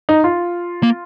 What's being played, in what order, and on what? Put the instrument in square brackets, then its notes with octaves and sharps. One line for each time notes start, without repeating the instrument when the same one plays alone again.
[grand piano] D#4
F4
[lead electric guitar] A#3